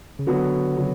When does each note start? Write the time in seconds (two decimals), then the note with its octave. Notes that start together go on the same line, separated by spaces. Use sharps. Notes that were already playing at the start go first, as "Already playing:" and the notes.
0.19 C#3
0.27 D3 F#3 B3 F#4
0.77 C#3 F#3